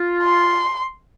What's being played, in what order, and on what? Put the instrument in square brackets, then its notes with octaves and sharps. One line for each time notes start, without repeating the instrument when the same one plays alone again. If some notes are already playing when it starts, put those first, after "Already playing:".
Already playing: [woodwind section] F4
[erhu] C6